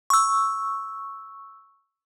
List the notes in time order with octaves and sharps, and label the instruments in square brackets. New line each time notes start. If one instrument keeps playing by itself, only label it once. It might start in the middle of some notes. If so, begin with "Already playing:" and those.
[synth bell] C#6 E6